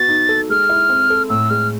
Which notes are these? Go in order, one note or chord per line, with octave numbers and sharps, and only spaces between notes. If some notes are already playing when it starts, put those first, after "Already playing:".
Already playing: B3 F#4 A6
D#4
A4
G#3 F6
E4
C4
A4
A2 E6
G#3 F6